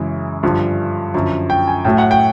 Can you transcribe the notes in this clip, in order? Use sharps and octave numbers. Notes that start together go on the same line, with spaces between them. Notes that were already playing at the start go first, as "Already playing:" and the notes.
Already playing: F#2 C#3 E3 G#3
G2 D3 F3
F#2 D3 F3
G5
G#5
A2 F#3 A3 G5
F#5
G5